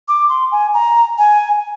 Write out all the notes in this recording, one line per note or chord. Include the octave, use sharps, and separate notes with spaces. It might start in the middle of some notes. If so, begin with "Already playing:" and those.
D6
C6
G#5
A#5
G#5